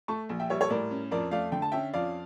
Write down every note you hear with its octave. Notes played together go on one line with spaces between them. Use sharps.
A3 A5 C#6
A#1
E5 G5
G3 C#5 E5
A4 C#5
A2 A#4 D5
C#4
F2 A#4 D5
A3 D5 F5
D3 G5
A5
C#4 E5 G5
F2 D5 F5